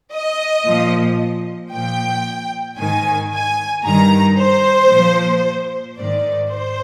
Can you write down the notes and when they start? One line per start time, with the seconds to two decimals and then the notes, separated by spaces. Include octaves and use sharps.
0.13 D#5
0.67 A#2 F3
1.72 A#2 F3 G5
2.78 G#2 D#3 G#5
3.32 G#5
3.85 G2 D#3 A#5
4.38 C5
4.91 A#2 F3
5.98 G#2 D#3 D5
6.51 C5